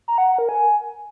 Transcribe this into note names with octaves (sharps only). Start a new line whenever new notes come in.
A#5
F#5
F#5
A#4
G#5